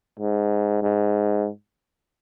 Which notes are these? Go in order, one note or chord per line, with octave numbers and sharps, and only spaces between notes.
G#2
G#2